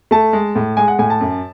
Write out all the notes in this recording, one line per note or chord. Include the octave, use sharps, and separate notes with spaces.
A3 A5
G#3
A2
G#3 G#5
F#5
A2 G#5
A5
F#2